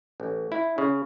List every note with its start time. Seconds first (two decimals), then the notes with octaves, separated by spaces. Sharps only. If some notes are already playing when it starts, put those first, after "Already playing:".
0.20 A1
0.52 E4
0.78 C#3